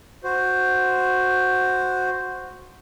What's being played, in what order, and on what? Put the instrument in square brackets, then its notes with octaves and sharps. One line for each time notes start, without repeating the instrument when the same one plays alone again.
[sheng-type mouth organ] F#4 C5